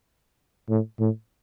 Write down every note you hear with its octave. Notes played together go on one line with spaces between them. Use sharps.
A2
A2